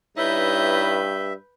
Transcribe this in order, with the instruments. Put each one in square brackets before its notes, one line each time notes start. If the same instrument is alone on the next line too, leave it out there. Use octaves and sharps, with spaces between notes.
[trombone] G2 [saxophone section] D#4 E4 C#5 [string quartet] B4 G6 [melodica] E5